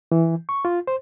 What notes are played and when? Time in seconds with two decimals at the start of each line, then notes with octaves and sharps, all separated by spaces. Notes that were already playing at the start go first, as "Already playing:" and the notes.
0.12 E3
0.49 C#6
0.65 F4
0.87 C5